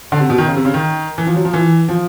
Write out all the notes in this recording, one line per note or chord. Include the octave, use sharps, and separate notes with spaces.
D3
C3
B2
D#3
C#3
C3
C#3
D#3
E3
F3
F#3
F3
E3
F3